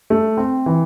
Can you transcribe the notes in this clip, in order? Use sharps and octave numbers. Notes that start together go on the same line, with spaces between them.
A3
C4
E3